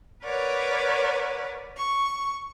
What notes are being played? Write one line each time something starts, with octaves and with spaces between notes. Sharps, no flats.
A#4 B4 C#5 D5 F#5
C#6